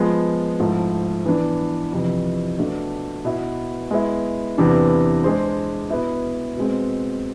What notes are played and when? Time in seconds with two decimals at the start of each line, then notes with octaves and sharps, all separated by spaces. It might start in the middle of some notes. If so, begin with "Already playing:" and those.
Already playing: F3 G#3 B3 F4
0.60 G#2 F3 A3 E4
1.26 E3 B3 D4
1.92 F2 C3 E3
2.58 B2 A3 D4
3.25 B2 B3 E4
3.91 G#3 B3 E4
4.58 E2 C3 E3 B3 D4
5.24 G#3 D4 G#4 C5
5.90 B2 B3 E4
6.56 B2 G#3 C4